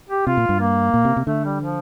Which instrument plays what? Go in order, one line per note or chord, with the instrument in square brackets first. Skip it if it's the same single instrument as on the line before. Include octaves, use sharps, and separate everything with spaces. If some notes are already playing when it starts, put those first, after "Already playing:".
[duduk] G4
[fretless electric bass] C3 [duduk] F4
[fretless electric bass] A#2
G2
[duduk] A#3
[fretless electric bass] A#2
C3
C3
[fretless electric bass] D3 [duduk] A3
[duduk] G3
F3